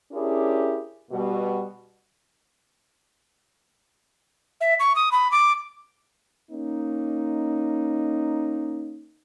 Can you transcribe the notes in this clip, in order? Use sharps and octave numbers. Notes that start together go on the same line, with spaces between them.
C#4 D4 E4 G4 G#4 A#4
B2 G3 F#4
E5
C#6
D#6
B5
D6
A#3 C#4 D#4